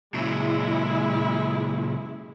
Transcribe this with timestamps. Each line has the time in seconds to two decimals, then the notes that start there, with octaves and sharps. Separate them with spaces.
0.14 A#2 C#3 F#3 G#3 E4